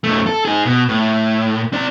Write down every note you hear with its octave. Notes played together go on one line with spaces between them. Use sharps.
F#2 A3
A4
D#4 G#4
B2
A2
C4 D5